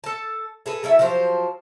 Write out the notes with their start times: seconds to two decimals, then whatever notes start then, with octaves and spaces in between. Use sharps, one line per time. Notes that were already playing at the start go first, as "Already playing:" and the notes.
0.04 A4 A5
0.66 G#4 A4 B4
0.83 F#3 A3 E4 E5
0.99 F3 F#3 G4 C5